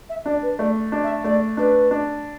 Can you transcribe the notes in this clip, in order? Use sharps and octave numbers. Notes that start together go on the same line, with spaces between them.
E5
D4 D5
B4
A3 D5
D4
E5
A3 D5
D4 B4
D4